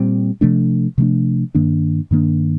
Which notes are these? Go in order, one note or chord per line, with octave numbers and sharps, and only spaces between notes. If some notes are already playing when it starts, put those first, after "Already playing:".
Already playing: A#2 G3 C4
C3 F3 A3 D4
C3 F3 A3 D4
G2 D#3 A#3 D4
G2 D#3 A#3 D4